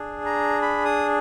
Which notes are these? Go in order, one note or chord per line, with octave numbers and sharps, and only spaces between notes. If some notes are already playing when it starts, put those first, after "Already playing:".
Already playing: D4 G#4
A#5
B5
D#6